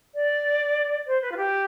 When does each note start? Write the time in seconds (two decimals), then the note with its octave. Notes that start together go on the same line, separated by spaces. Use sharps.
0.15 D5
1.07 C5
1.22 B4
1.32 F4
1.37 G4